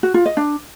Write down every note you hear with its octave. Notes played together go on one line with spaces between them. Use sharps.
F#4
F4
D#5
D4